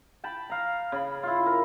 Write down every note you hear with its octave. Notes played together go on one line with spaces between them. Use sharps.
G5 A5 B5
F5 A#5
C#3 B5
E4 F4
A#4